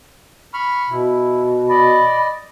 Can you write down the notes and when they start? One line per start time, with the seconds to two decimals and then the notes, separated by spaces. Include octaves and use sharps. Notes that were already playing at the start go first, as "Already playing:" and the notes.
0.53 B5 C#6 F6
0.90 B2 E4
1.69 D5 D#5 B5